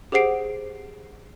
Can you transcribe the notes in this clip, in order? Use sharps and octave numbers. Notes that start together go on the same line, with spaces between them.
G4 G#4 C5 F#5 C7 D7